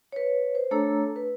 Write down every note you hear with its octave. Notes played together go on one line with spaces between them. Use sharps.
B4 C#5
C5
A3 D4 A4 C#5 A#5 E6
B4